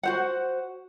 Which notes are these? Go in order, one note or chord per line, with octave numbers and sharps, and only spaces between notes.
F#4 C5 F#5